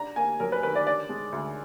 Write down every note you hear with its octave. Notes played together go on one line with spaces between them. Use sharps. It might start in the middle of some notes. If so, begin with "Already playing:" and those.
Already playing: D3 D4 A#5
A#3 G#5
F#2 A#4
B4
D#3 B4
D5
D4 D5
G#3
D2